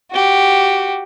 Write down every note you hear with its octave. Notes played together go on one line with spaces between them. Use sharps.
F#4 G4